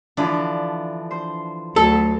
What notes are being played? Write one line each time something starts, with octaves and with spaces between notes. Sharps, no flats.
D3 E3 F3 D4
C5
D2 F#3 A4